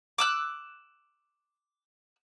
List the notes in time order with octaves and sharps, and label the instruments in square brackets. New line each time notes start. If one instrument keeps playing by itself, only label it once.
[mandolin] D6 E6 F#6